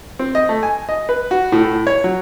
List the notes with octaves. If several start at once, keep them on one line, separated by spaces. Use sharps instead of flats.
C4
D#5
A3
G#5
D#5
B4
F#4
A2
A2
C#5
F#3